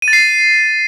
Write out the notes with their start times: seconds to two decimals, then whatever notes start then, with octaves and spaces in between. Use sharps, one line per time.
0.02 D#7
0.08 A6
0.13 C7